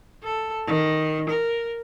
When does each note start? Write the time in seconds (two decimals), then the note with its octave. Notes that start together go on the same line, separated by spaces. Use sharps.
0.24 A4
0.66 D#3
1.30 A#4